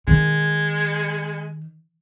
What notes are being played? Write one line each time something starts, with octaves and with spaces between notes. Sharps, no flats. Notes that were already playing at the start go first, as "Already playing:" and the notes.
D#3 G#3